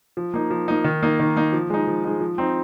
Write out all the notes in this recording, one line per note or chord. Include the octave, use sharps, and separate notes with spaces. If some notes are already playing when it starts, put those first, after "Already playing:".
F3
A#3 D#4
F3
A#3 D#4
D#3
A#3 D#4
D#3
A#3 D#4
F3
G#3 D#4
F3
G#3 D#4
F3
C4 D#4